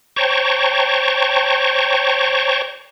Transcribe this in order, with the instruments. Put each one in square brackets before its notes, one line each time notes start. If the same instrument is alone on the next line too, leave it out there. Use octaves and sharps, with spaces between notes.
[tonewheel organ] C5 C#5 G5 A5 A#5 C#6